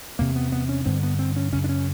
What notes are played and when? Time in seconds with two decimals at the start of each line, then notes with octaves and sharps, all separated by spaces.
0.19 E2 C3 A#3
0.36 B3
0.52 B3
0.69 C#4
0.86 G2 D3 C4
1.03 B3
1.19 C4
1.36 C#4
1.53 F#2 C#3 C#4
1.64 D4
1.69 C#4